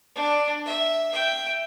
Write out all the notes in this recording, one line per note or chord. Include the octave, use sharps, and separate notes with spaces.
D4
E5
E5 G5